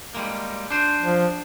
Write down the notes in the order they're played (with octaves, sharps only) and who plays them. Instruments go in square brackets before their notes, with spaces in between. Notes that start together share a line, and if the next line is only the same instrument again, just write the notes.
[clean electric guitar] G3 G#3 A#3
D4 C5
[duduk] F3